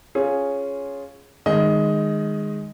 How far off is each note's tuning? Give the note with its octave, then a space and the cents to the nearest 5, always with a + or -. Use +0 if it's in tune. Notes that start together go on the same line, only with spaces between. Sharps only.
C#4 +0 F4 +0 G#4 +0
D#3 -20 G#3 -10 D#5 +15